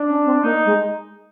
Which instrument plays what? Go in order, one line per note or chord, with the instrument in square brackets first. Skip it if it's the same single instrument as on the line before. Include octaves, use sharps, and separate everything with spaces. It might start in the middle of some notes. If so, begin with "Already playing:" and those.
Already playing: [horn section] D4
[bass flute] C#4
C4
[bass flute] A#3 [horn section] D#4
[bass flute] G#3